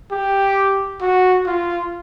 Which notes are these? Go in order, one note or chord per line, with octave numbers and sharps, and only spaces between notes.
G4
F#4
F4